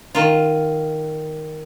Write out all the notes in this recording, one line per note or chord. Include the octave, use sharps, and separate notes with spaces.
D#3 F4